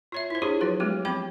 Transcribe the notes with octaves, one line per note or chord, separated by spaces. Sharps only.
F4 C#5 E5
E4 C5
D4 E4 F4 G4 G#4 C#5
F3 F#3 F#4 B4
G#3 A3 B3 F#4 G4
F3 B3 C4 G5 B5 D6